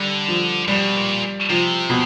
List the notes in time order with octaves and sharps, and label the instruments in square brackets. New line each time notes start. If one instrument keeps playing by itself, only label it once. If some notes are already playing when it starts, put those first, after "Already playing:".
Already playing: [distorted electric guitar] D3 [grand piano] G3
[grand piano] F3
[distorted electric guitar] B2 [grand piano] G3
[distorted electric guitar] A#2
[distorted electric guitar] C3 [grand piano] F3
[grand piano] B2